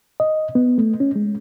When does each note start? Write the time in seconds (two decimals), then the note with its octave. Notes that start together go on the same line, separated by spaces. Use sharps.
0.20 D#5
0.55 B3
0.78 A3
1.00 C#4
1.16 G#3